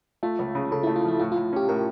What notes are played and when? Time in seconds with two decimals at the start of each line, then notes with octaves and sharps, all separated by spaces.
0.23 A3 F4
0.39 C#2
0.55 C#3
0.71 C#3 A4
0.83 E4
0.87 A3
0.96 F4
1.04 F3 E4
1.20 A2 F4
1.32 F4
1.36 A2
1.53 C#4 G4
1.69 A2 A#4